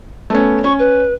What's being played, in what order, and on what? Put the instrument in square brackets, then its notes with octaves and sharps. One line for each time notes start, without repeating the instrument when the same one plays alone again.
[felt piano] A3 B3 C#4
[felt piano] C#4 [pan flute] C#6
[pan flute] B4